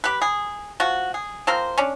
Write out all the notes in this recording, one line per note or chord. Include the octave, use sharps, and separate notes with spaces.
G4 B4
G#4
F3 F#4
G#4
F3 C4 A#4 C5
C#4 D4